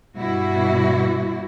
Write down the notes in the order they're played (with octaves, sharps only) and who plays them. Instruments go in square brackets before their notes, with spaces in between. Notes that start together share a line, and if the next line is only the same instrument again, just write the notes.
[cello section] G2 B2 G3 E4 F#4